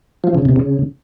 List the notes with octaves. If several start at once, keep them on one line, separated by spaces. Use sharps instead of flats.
F3
C#3
C3
C#3